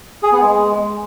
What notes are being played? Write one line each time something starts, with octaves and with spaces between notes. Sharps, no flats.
G#4
B3
G#3